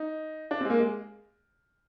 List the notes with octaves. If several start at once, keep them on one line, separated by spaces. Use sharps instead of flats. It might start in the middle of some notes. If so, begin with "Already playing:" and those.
Already playing: D#4
D4
C4
G#3
A#3
G#3